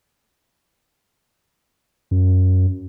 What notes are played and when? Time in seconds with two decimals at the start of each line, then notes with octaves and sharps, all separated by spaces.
2.11 F#2